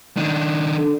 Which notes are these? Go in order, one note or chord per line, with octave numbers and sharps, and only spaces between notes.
D#3 D4
D3